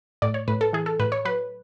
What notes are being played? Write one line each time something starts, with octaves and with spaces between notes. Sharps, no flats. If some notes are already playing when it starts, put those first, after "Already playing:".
A2 D5
C#5
A2 B4
A4
E3 G#4
A4
A2 B4
C#5
F#3 B4